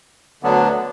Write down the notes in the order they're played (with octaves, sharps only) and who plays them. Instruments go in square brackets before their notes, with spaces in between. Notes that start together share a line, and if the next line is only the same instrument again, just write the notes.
[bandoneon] D2 D3 F#3 B3 D4